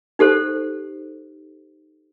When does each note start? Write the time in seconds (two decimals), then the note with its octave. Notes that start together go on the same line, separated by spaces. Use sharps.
0.19 D#4 G4 A4 C5